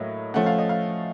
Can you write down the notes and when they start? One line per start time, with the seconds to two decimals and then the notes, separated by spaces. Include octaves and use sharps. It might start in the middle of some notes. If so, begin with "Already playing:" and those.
Already playing: A2 F#3 A#3 D#5
0.34 F3 A3 C#4 F#5
0.46 F5
0.58 D#5
0.69 F5